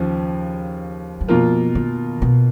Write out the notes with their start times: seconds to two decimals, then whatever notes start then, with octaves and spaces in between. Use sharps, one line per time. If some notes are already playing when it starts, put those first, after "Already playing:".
Already playing: D#2 C#3 F3
1.21 F#3
1.28 B2 F3 A#3 F4 A#4
1.75 D#3
2.22 B2